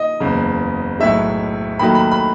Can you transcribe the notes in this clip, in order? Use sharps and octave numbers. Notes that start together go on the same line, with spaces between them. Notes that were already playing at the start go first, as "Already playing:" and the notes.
Already playing: D#5
F#1 E2 C#3
B1 A2 G#3 E5
D#2 D#3 F#3 A3 B5
B5
B5